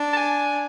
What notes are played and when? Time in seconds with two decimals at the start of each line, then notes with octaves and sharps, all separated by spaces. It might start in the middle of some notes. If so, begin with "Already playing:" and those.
Already playing: D4
0.13 A5
0.17 G#5